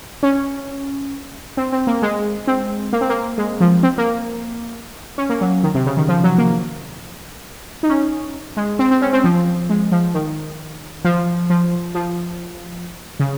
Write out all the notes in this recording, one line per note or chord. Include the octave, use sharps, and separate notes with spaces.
C#4
C4
C4
A#3
G#3
C4
A#3
C4
A#3
G#3
F3
C4
A#3
C#4
A#3
F#3
D#3
C3
C#3
D#3
F3
F#3
A#3
D#4
C#4
G#3
C4
C4
C#4
C4
F3
G#3
F3
D#3
F3
F3
F3
C#3